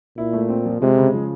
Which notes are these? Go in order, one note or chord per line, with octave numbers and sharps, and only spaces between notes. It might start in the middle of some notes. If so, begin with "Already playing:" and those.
A#2 E4
A3
C4
F3
C3 G#3
C#3
F3